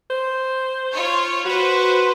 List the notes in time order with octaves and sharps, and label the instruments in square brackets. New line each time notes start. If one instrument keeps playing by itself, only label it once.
[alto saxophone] C5
[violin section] F4 C#5
[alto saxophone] F#4 [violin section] B4 C5